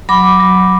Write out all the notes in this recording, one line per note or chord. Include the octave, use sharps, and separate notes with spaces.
F#3 B5 D6
F#3